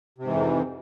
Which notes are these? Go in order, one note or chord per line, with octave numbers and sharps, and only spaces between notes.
F2 G#2 C3 E3